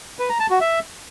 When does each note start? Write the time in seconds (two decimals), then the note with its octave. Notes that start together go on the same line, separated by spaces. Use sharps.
0.19 B4
0.29 A#5
0.40 A5
0.50 F#4
0.60 E5